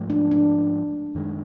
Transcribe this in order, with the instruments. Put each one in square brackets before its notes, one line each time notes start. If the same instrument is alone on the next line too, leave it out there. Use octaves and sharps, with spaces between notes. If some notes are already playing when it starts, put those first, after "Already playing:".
Already playing: [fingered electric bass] G#2 F3 A3
[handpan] D4
D4
[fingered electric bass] F#2 D#3 G#3